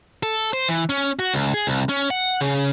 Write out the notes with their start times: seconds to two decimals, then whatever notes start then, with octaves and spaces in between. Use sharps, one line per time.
0.23 A4
0.53 C5
0.69 E3
0.90 C#4
1.19 F#4
1.34 C#2
1.54 G#4
1.67 C2
1.89 C#4
2.10 F#5
2.41 C#3